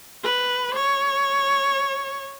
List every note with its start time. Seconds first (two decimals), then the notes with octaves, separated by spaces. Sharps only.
0.24 B4
0.75 C#5